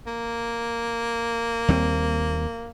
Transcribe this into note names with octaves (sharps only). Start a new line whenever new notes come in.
A#3
D#2 G3 C4